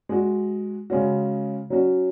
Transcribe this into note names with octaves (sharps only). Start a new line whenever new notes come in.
G#3 F#4
C#3 G#3 C#4 F#4
F#3 C#4 F#4